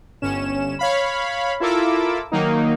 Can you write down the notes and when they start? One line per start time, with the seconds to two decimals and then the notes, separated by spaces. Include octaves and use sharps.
0.22 G1 C#4 E7
0.79 C#5 F5 B5
1.60 E4 F4 A4 A#4 D6 E6
2.32 D#3 F#3 A#3 D#4